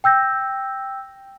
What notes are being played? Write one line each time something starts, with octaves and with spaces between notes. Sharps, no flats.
G5 E6 G6 A#6